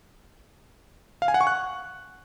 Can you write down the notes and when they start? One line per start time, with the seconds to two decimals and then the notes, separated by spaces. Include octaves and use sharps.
1.22 F5
1.28 G#5
1.34 F#5
1.41 C#6
1.47 F#6